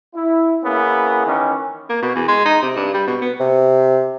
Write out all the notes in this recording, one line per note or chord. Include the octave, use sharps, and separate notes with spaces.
E4
A#3 B3 C#4 E4 G#4
D#3 E3 C#4
A#3
B2
E2
G#3
D#4
C3
G2
G3
B2
B3
C3